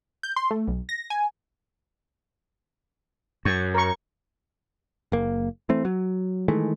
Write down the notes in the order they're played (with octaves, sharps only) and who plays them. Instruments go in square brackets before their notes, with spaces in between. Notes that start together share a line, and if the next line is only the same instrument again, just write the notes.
[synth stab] G6
C6
A3
B1
A#6
G#5
[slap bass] F#2 [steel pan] C#6
[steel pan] A#4 C#6
[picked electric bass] F#1 A#3
E3 A3 C4
F#3
D#3 E3 G#3 A3